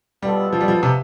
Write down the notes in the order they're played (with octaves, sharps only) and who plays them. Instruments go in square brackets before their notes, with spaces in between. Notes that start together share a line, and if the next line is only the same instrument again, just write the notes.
[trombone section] B2 B3 F4 A4 [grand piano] G3
[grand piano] F3
G3
F3
C3